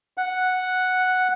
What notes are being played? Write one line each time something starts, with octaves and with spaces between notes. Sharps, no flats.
F#5